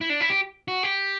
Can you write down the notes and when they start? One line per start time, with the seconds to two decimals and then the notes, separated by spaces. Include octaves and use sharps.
0.01 E4
0.10 D4
0.21 E4
0.30 G4
0.68 F#4
0.83 G4